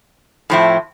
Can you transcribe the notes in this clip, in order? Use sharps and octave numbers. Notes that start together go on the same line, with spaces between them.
A2 F3 C4 E4